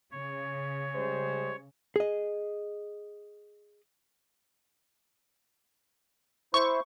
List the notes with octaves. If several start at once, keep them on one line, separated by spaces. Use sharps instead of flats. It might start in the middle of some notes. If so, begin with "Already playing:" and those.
C#3 C#5
G3 G#3 C5
G#4 D#5
E4 C5 C#6